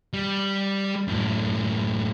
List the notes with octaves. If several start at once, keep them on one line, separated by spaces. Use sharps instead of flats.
G3
F#2 A2